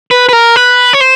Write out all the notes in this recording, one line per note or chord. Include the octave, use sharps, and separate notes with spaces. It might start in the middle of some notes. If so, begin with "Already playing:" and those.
B4
B4
A#4
B4
C#5
C5